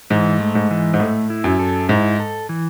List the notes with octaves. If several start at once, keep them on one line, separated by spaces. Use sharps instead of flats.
G#2 E3
A3
G#2
E3
G#2
A2 A3
E4
F#2
A4
G#2 E4
A4
E3